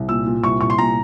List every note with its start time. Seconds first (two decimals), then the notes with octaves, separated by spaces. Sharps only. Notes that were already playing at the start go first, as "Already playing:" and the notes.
Already playing: C2
0.08 A#2 E6
0.26 A#2
0.44 C2 C#6
0.61 C2 C#6
0.70 C6
0.78 A#2 A#5